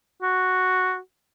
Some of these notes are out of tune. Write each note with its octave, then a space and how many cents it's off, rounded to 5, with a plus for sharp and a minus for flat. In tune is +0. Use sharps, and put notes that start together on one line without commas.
F#4 +0